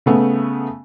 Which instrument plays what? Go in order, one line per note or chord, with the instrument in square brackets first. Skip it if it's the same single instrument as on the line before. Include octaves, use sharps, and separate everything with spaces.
[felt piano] C#3 A3 B3